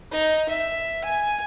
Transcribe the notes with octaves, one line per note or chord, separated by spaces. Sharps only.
D#4
E5
G#5